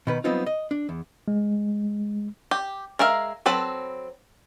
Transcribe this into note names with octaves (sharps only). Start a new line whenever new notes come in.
B2 D#3 B4
F#3 G3 B3 C4 D#4 F4
D#5
D4
E2
G#3
G4
G#3 A#4 E5 F5
F#3 C4 A4 B4 B5